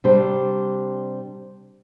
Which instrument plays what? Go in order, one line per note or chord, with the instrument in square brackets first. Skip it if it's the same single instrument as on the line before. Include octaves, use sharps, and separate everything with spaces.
[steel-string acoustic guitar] C3 G3 D4 G4 C5